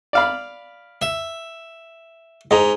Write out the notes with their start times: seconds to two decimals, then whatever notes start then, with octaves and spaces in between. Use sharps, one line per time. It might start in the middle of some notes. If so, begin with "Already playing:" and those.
0.13 D5 F5 B5
1.02 E5
2.51 G#2 D#5 A#5